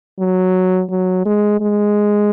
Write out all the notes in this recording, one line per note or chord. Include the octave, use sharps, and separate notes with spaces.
F#3
F#3
G#3
G#3